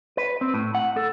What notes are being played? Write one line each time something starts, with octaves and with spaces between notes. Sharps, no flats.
B4
C4
A2
F#5
A4